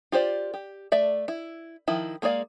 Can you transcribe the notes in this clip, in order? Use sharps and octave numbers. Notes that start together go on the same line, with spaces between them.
F4 G4 C5 D5
G4
A3 D5 E5
E4
D#3 F3 E4
G#3 A#3 G#4 D5 F5